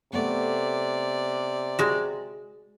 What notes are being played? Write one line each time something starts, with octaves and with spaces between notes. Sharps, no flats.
C3 A3 B3 D5
G#3 F#4